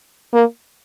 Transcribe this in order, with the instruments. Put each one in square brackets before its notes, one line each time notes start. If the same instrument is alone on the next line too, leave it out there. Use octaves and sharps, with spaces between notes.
[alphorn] A#3